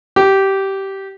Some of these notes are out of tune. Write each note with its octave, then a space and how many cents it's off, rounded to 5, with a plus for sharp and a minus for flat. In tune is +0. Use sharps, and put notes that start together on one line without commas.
G4 -15